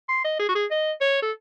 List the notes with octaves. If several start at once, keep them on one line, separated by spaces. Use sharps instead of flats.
C6
D#5
G#4
F#4
G#4
D#5
C#5
A4